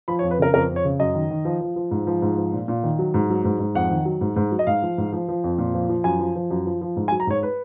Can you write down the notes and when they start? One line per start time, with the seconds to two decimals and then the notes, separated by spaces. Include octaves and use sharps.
0.08 F3 B5
0.19 C#5
0.23 F2
0.31 B4
0.39 C#3 A#4
0.54 F2 A#4
0.69 F2
0.76 C#5
0.85 C#3
0.99 F#2 D#5
1.15 D#3
1.30 D#3
1.45 F3
1.61 F3
1.76 F3
1.91 G#2
2.07 F3
2.22 G#2
2.37 F3
2.53 A#2
2.68 A#2
2.83 D#3
2.99 F#3
3.14 G#2
3.30 F#3
3.45 G#2
3.59 G#2
3.75 F2 F#5
3.91 D#3
4.05 F#3
4.21 G#2
4.36 G#2
4.52 F#3
4.59 D#5
4.67 G#2 F5
4.83 F3
4.98 G#2
5.13 F3
5.28 F3
5.44 F2
5.58 A#2
5.74 F3
5.89 F3
6.04 F#2 G#5
6.20 F3
6.36 F3
6.51 F#2
6.66 F3
6.81 F3
6.96 G#2
7.08 G#5
7.12 F#3
7.20 A#5
7.27 G#2 C#5
7.43 B4